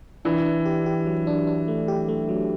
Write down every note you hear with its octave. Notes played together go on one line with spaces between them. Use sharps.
E3 D4
D4
G4
G4
F#3
D4
D4
A3
G4
A3
F#3